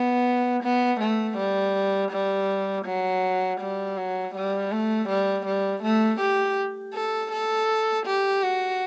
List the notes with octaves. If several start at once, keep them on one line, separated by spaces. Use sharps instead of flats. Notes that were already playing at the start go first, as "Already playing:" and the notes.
Already playing: B3
B3
A3
G3
G3
F#3
G3
F#3
G3
A3
G3
G3
A3
G4
A4
A4
G4
F#4